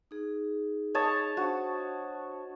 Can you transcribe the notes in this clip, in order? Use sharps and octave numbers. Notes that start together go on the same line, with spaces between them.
D#4 G#4
C#5 D#5 A5
D4 F#4 C5 A5